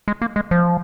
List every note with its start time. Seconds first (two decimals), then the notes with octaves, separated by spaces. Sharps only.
0.08 G#3
0.22 A#3
0.36 G#3
0.51 F3